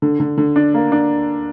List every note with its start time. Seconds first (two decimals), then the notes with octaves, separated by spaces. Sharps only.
0.02 D3
0.20 D3
0.38 D3
0.56 D4
0.74 A#3
0.92 D4